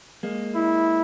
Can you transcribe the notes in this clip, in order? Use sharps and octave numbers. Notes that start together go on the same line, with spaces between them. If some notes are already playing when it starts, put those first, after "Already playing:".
G#3 A#3
E4